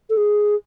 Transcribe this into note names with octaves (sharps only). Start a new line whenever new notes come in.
A4
G#4